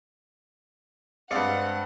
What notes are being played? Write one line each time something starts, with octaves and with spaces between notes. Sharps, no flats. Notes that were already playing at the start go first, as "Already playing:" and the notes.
G2 G#3 C4 D5 F5 F#5 C#7